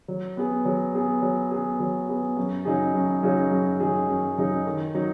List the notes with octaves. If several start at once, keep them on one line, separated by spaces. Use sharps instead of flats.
F#3
B3 G#4
F#3
B3 G#4
F#3
B3 G#4
F#3
B3 G#4
F#2
C#3 F#3 D#4 G#4
F#2
C#3 F#3 D#4 G#4
F#2
C#3 F#3 D#4 G#4
F#2
C#3 F#3 D#4 G#4
D#3
F#3 D#4